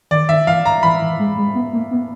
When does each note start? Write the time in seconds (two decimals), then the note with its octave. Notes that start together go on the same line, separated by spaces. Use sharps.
0.11 D#3 D5
0.29 D#3 E5
0.47 E3 F5
0.66 A#5
0.83 E3 B5
1.01 E3
1.19 G#3
1.37 G#3
1.55 B3
1.73 A#3
1.91 B3